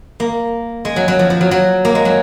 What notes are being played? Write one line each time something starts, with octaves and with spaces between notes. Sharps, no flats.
A#3
G#3
F#3
F#3
F3
F3
F#3
F#3
A#3
G#3
F#3